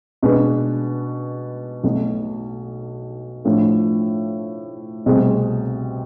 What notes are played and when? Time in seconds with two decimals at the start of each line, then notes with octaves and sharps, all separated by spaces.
0.23 B2 G#3 D4 G#4 B4
1.83 B1 B2 A3
3.45 A2 F3 A3 D4
5.06 C2 B2 A3 C4 G#4